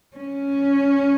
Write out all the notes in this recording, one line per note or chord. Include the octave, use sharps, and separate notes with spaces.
C#4